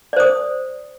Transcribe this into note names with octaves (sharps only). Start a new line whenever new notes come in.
C5 D5 D#6